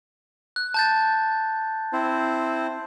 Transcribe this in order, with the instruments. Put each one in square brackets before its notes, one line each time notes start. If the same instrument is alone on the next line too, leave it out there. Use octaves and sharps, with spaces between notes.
[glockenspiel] F#6
A5 G6 A6
[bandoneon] C4 E4 C5